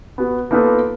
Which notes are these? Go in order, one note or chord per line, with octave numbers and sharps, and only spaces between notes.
B3 F#4
A#3 B3 D#4 F4 A4 B4